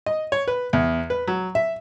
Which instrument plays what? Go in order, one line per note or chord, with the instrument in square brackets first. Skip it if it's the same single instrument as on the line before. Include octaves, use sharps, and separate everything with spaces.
[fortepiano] D#5
C#5
B4
E2
B4
F#3
E5